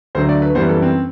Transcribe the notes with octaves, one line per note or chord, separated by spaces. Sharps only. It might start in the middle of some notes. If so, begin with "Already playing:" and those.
D2 D3 F#3 A3 C5
D5
B4
F#2 E3 G3 B3 C5
A4
C4